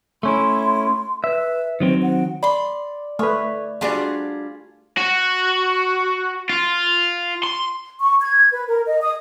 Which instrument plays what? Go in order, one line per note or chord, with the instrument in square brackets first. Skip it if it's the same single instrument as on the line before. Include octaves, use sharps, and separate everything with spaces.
[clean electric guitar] A3 C#4 E4 [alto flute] C6
[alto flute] B4 [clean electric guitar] E5
[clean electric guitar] D#3 F#3 C4 [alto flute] C5
[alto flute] F#5
[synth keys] D5 [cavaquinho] B5 C6
[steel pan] A3 B4 [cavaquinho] C#5
[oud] G3 D4 F#4 [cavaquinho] F4 G#4 C6
[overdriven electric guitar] F#4
F4
C6
[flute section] C#6
G#6
B4
A#4
D#5
D#6